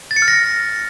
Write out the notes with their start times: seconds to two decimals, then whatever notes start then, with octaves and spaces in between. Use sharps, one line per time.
0.11 A6
0.16 C#7
0.22 F6
0.28 A#6